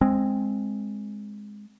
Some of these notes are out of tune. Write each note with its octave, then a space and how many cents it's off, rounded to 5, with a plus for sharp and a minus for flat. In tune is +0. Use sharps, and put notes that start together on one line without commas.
G#3 +0 C4 +10